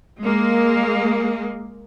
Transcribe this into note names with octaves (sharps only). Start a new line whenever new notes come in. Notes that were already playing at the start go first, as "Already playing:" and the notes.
G#3 A#3